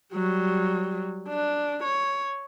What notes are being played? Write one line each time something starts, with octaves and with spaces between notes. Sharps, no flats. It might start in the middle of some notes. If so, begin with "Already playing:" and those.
F#3 G3
D4
C#5